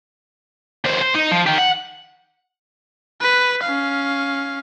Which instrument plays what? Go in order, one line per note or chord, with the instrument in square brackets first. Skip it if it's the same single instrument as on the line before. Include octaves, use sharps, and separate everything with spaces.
[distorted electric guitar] D#2 C5
C5
D#4
F3
D#3 G4
F#5
[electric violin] B4
C#4 F5